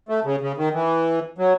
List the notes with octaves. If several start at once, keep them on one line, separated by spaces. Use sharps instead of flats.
A3
C#3
C#3
D#3
E3
F#3